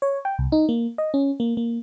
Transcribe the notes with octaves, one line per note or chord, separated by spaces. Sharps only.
C#5
G5
C2
D#4
A#3
D#5
C#4
A#3
A#3